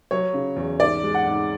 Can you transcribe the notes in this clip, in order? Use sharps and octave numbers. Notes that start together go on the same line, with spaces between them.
F#3 C#5
C#3
E2
G#2 D5
G#3
F#5
G#2